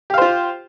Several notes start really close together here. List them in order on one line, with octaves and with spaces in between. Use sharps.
G4 F5 C5 F4